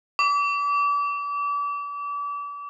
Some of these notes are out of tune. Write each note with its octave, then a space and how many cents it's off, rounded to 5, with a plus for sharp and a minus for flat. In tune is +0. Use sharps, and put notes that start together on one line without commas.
D6 -35